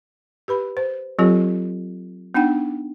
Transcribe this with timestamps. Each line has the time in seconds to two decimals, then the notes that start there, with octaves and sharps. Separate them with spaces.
0.48 G4 B4 B5
0.77 C5
1.19 F#3 C4 F4 G4 A4 C#5
2.34 B3 D4 D#4 F#5 G5